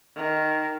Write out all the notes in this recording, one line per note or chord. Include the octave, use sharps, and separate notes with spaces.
D#3